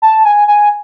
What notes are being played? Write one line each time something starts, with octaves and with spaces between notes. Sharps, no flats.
A5
G#5
G#5